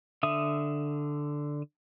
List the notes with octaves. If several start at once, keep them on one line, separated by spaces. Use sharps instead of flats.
D3 E5 D#6